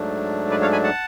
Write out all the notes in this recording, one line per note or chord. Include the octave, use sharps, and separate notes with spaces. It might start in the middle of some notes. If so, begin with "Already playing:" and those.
Already playing: G#2 F#3 A3 D4
B4 D5
C#5 F5
G#5 B5
F#5 A5